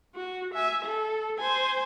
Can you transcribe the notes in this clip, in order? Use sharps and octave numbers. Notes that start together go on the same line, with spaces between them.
F#4
E5 G#5
A4
C5 G#5